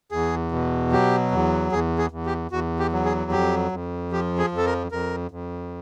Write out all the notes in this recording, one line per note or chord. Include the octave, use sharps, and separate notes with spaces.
E2 G#4
B2
F#3 G4
E2
E2 G#4
G#4
E2
G4
E2 F#4
G4
F#3
G#4
F2 G4
F2
F3 G4
G#4
F2
A4
A#4
F2 A#4
F2